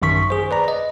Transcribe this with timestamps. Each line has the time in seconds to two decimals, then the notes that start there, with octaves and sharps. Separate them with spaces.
0.02 A1 F#2 D#3 C#6 B6
0.30 G#4 C5
0.51 B4 D5 A#5
0.68 D#5